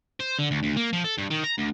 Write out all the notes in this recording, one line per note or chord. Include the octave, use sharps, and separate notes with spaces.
C5
D3
D2
D2
A#3
F3
A4
G2
D#3
A#5
D2